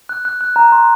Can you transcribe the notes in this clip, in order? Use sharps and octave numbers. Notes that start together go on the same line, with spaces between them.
F#6
F#6
F#6
A#5
C6